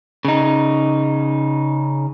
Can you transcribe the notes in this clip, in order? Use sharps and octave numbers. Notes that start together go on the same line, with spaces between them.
C#3 D#4